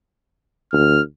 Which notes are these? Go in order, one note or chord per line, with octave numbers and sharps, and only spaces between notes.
D2 F6